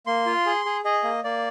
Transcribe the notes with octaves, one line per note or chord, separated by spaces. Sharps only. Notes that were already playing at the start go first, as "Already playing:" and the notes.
A#3 C6
F4
G#4
G#4
G#4 D#5
A#3
A#3 D5